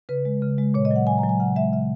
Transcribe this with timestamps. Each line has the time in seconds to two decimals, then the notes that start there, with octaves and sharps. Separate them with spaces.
0.09 C#3 B4
0.25 G#3
0.42 C#3
0.58 G#3
0.74 A#2 C#5
0.85 D#5
0.91 F#3 F#5
1.07 A#2 G#5
1.18 A#5
1.23 F#3
1.29 G#5
1.40 C#3 F#5
1.56 G#3 E5
1.73 C#3 E5